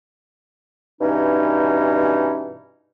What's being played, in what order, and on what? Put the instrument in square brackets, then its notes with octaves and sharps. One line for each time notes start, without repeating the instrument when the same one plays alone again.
[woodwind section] G2 B2 E3 C#4 D#4